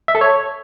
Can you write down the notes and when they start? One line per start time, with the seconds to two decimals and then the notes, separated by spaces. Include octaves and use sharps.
0.08 E5
0.15 A4
0.21 C#5